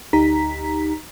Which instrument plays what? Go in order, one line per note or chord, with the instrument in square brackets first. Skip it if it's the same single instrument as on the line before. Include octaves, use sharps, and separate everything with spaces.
[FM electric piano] D2 D#4 G4 A#5 B6